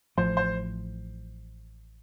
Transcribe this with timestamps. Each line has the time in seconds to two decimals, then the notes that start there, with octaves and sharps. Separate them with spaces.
0.17 A1 A2 F3 C5
0.37 C5